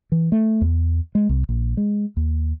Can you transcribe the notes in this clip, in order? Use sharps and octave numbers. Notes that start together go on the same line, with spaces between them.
E3
A3
E2
G#3
C2
A#1
G#3
D#2